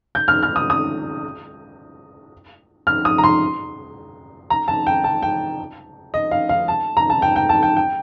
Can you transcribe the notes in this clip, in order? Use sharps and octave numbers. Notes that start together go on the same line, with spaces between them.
G6
F6
F6
D#6
D#6
F6
D#6
A#5
C6
A#5
A5
G5
A5
G5
D#5
F5
F5
A5
A#5
A5
G5
G5
A5
G5
G5